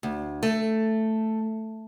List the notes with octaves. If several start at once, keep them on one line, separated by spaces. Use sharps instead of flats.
D2
A3